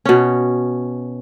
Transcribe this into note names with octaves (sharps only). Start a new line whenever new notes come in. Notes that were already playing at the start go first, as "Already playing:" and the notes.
B2 C#4